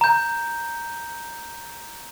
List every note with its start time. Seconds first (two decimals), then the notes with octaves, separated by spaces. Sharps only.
0.01 A#5 G6